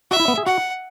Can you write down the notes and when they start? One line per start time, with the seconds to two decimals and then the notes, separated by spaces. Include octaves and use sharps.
0.11 F#4 E5
0.20 E4
0.28 B3
0.38 G#4
0.46 F#4 F#5